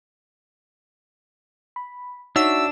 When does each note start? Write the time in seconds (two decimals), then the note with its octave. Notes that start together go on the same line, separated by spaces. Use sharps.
1.76 B5
2.36 D4 D#4 F#4 C#5 E5 E6